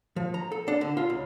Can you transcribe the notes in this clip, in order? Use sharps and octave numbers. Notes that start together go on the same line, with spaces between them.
F3
A#5
A4
D4
D3
F4
C#2